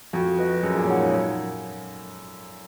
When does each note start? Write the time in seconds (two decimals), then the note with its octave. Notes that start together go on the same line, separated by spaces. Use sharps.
0.13 F2 F#4
0.39 B4 D#5
0.63 F#2 G#4
0.76 A#2
0.87 G#2 C#5
0.91 F#5
1.11 F#2 D#4